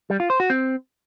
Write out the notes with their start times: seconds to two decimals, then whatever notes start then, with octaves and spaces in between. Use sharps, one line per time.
0.10 G3
0.20 F4
0.30 C5
0.40 F#4
0.50 C4